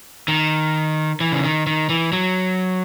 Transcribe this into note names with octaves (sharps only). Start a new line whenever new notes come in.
D#3
E3
C#3
D#3
D#3
E3
F#3